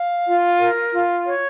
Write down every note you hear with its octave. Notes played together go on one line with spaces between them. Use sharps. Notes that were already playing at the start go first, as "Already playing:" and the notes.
Already playing: F5
F4
A#4
F4
C#5